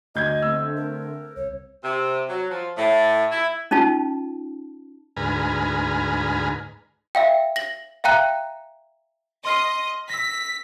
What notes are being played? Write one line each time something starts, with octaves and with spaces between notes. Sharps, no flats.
D2 D#5 G6 G#6
D3 A3 C4 E6
A#4
C2 C#5
C3
F#3
F3
A2
E4
C#4 D#4 F4 A5
D2 G#2 B4 G#5 A#5 F6
E5 F5 G5
A#6 F#7
E5 F5 G5 A#5 F#6
D#5 C6 F6 C7
E6 A#6 B6